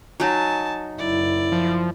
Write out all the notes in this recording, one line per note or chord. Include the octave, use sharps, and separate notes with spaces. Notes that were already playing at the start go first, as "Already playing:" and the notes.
F#3 D#4 G#5 A5
F#1 E4 D5
F3